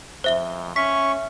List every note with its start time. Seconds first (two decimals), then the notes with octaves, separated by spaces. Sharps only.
0.24 F2 C5 E5 G7
0.76 C#4 E5 C#6 B6